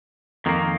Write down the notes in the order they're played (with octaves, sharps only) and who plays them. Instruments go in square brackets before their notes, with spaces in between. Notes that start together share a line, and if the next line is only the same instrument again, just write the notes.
[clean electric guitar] F2 D#3 A#3